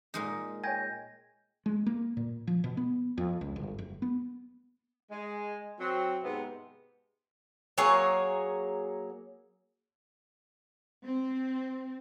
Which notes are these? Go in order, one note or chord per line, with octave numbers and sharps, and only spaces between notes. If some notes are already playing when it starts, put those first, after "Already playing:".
A#2 G#3 D#4
C#5 G5 G#5 G6 G#6 A#6
G#3
A#3
A#2
F3
B2
B3
F2
C#2
G1
F#1
B3
G#3
F#3 C4
G#2 C3 B3
F#3 A#3 G#4 C#5
C4